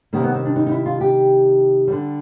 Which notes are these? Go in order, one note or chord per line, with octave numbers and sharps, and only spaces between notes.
C3 D#3 G3 A#3
B3
C4
D4
D#4
D#4
E4
F4
G4
D3 G3